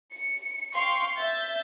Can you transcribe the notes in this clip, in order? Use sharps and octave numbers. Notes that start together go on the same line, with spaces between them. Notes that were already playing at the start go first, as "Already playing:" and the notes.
C#7
F5 G5 C6 C#6
E5 G6 A6